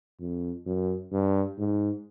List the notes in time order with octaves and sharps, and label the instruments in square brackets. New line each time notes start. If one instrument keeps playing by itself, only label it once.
[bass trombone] F2
F#2
G2
G#2